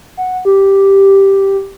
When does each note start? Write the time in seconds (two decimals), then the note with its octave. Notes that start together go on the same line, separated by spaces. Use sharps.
0.17 F#5
0.45 G4